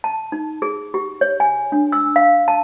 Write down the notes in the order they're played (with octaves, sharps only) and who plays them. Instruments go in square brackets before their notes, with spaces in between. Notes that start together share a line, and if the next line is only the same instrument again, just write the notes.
[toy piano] A5
D#4
G#4
G4
C#5
G#5
D4
E6
F5
A5